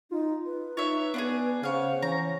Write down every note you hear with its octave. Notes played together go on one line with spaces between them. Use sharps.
D#4 F4
B4
D#4 C#5 E5
B3 D4 F4 G#4
C#3 C5 C#5 F5 F#5
E3 C#4 A#5